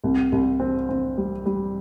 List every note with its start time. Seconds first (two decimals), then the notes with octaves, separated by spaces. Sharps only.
0.04 C2
0.32 C2
0.60 C4
0.89 C4
1.18 G3
1.46 G3